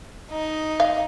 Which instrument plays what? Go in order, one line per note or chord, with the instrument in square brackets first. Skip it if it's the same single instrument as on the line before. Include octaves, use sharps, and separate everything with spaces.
[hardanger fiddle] D#4
[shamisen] F5